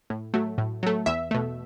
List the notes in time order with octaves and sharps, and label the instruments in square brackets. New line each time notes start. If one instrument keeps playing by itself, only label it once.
[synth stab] A2
F#3 A3
A2
F#3 A3
E2 E5
B2 A3